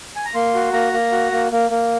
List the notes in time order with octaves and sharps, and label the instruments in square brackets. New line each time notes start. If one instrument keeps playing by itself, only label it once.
[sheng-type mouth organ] G#5
A#5
A#3 C6
F#4
A#3 A#5
A#3
F#4
A#3
A#3
A#3